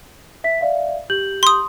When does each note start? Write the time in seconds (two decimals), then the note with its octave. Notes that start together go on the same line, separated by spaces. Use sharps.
0.44 E5 B6
0.61 D5 E5 F5
1.10 G4 G6 F#7
1.43 C6 D#6